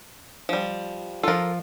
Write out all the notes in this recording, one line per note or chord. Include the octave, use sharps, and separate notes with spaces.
F3 G3
F3 F4 A4 A#4